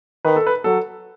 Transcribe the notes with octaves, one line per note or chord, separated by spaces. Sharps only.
D#3 B4
A4
B4
F#3 A4